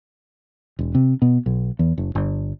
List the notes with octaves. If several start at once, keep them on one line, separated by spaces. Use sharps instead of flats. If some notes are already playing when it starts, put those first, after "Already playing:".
E1
C3
B2
B1
E2
F#1
G1